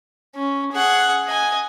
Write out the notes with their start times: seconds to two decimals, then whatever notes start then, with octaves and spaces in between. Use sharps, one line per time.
0.36 C#4
0.73 G#4 F#5
1.28 D#5 G#5